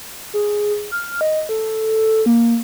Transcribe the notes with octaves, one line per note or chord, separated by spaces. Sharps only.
G#4
F6
D#5
A4
A#3